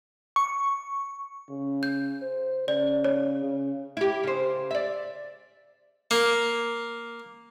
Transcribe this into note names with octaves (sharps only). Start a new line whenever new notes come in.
C#6
C#3
G6
C5
C#3 D5
C#5
C#3
E4 G4
C#3 C5
D5 E5
A#3